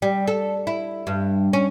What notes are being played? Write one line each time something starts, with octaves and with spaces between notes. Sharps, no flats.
G3
A4
E4
G2
C#4